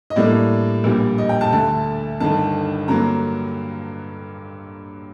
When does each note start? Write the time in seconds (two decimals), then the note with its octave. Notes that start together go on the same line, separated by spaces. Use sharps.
0.10 D#5
0.16 A2 G3 A#3 D4 D5
0.84 A#1 A#2 G3
1.18 D#5
1.29 G5
1.41 A5
1.52 D2 D3 A3
2.20 G1 G2 D#3 A5
2.88 G2 D3 F#3 A#3 A#5